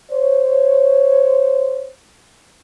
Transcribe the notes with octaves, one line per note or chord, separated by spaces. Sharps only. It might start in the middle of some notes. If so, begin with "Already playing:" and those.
C5 C#5